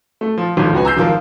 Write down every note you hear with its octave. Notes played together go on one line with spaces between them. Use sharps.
A3
F3
G#1 D3 F3
C#2 F#4 B4 G#5
A#5 E6 G6 C7
G#1 F3 F4 A#4